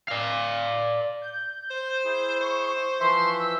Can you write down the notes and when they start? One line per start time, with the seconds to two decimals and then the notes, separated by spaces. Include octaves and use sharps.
0.08 D5 F5
1.22 G6
1.70 C5
2.05 E4 G#4
2.40 C5 C#6
3.00 E3 F3 E5 C6
3.39 E6